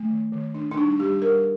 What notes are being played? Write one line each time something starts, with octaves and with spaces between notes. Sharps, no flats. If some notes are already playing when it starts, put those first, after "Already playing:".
Already playing: A3
D#3
D#3
D4
D4
G3 D#4
G3 G4
G3 A#4